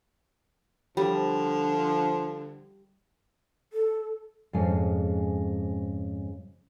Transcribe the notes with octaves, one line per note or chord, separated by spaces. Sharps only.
D3 F3 G3
A4
F2 G#2 C#3 G#3 F4 G#5